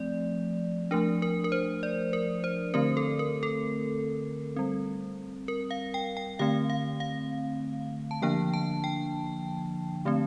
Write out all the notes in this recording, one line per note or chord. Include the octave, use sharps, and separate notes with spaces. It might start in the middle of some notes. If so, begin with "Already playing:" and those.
Already playing: F3 A3 C4 D5
F3 A3 D4 A#4
A#4
A#4
C5
D5
A#4
C5
D3 A3 C4 A#4
A4
A#4
A4
G3 C4
A#4
F5
G5
G5
D3 A3 C4 F5
F5
F5
A5
D3 F3 A#3 D4 G5
A5
G5
D3 A3 C4